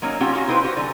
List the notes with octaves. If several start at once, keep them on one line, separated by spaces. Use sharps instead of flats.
F#3 A#3 C#4 D#4
C4 C#4 F4 G4 F#5
C#4 D#4 F#4 F5
B3 C4 D#4 E4 B4 C5
F#4 G4 B4 C5
D3 F#3 G#5